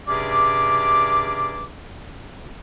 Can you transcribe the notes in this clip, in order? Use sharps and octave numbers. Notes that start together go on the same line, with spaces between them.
G2 C3 C#4 G#4 D5 D6